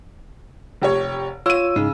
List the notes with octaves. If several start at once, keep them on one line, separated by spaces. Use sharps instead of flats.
F1 G4 C#5
F4 C#5 E6 D#7
G#2 C#3 D#4